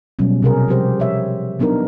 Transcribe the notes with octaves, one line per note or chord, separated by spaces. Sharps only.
B2 F#3 G3 C#4
C3 G#4 A#4
F3 G3 G4 C5
C#5 E5
F#3 B3 D4 D#4 A#4